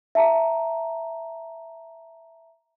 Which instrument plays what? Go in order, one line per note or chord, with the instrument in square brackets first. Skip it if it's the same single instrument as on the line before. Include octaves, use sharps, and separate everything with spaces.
[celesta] E5 A5 A#5